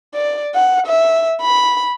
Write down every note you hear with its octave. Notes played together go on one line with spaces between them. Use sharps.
D5
F#5
E5
B5